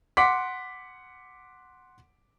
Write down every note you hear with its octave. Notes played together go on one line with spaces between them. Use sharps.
F#5 C6 D6 B6